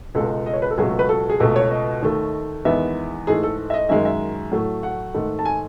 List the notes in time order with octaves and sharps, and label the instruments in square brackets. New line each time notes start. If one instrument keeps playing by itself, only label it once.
[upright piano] C#2 B2 G#3 A4
D#5
C#5
B4
A4
C#2 B2 F#3 A3 G#4
A4
B4
A4
G#4
C#2 B2 A3 A4
C#5
D#5
D#2 D#3 A3
E2 D#3 G#3 B3 E5
G#2 E3 A3 G#4
A4
E5
D#5
F#2 D#3 G#3 E5
E5
A2 F#3 A3
F#5
G#2 D#3 A3
A5
G#5